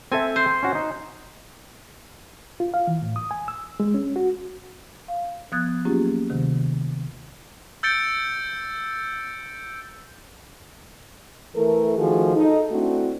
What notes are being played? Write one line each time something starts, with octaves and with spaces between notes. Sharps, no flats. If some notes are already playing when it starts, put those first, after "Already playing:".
C4 A4 E5 G#5
C5
C#4 F#4
D#4
F4
F5
E3
A2
D#6
G#5
E6
G#3
C#4
F#4
F5
F3 B3 D#6 F#6 G#6 A6
F#3 A#3 C#4 F4 G4 G#4
D2 C3 D#3
E6 G6 A6 C#7 D7 G7
E3 A3 A4 A#4
D#3 F3 A3 F#4 G#4
D#4 A4
A3 C4 D4 E4 F#4